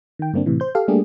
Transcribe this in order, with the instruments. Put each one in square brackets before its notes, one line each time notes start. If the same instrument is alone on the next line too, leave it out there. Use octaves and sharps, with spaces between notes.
[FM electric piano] D#3 G5
G2 D3 A#3 C4 D4
A2 C3 E3
C5 G6
G4 A4 F5
G3 A3 A#3 D4 G4 G#4